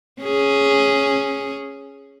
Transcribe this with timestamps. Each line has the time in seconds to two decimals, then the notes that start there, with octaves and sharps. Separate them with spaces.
0.22 C#4 G#4